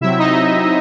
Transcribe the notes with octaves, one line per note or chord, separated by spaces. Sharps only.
C3 F#3 C4 E4 E5
D#4 D#5